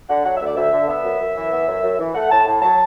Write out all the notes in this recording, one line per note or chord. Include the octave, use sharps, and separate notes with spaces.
D3 F#5
F#3 F#5
E5
D2 D5
D2 E5
D3
B3 E5
F#2
F#2
E3
B3
F#2
F#2
E3
A3 F#5
A2 A5
A2
F#3 A5